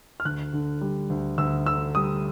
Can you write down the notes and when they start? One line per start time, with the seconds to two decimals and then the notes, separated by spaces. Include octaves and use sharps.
0.20 F6
0.25 D2 F#6
0.53 D3
0.81 G3
1.10 D2
1.38 D2 E6
1.66 D3 E6
1.95 G3 D#6